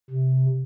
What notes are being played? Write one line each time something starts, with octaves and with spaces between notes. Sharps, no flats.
C3